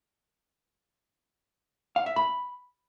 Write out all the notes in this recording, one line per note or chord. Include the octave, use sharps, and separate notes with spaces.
F5
E5
B5